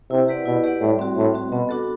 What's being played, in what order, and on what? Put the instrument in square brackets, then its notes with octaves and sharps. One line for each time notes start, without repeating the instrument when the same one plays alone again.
[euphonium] C3 [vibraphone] E4
[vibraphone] G4 B4 D5 F#5
[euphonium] B2 [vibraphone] E4
[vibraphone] G4 B4 D5 F#5
[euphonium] A2 [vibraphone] G3
[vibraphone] C4 F#4
[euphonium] A2 [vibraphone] G3
[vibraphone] C4 F#4
[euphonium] B2 [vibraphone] B3
[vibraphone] D4 F#4 A4